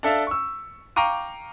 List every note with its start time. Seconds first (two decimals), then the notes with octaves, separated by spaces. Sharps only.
0.03 D4 A4 E5 F5
0.27 C#6 E6
0.96 F5 G5 A#5 C#6 D6 D#7